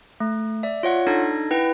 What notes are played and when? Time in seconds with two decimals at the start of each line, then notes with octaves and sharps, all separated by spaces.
0.20 A3
0.63 D5 E5
0.83 F4 C#5 F#5
1.07 D4 D#4 A4 G#6 A#6
1.51 E4 B4 F#5 G5